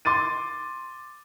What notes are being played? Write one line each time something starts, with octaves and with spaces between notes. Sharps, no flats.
C6 D6 A6 D#7